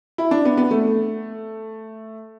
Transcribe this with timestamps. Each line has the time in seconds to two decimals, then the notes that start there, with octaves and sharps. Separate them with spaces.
0.18 E4
0.31 D4
0.45 B3
0.57 B3
0.71 A3